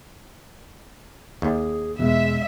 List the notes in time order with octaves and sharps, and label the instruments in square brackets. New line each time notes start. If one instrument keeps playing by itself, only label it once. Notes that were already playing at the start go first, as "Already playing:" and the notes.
[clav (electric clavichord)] D#2 [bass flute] G#4
[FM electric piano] E2 B2 [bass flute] G#3 [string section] E5